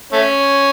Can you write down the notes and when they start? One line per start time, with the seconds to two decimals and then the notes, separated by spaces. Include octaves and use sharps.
0.13 A3 C#4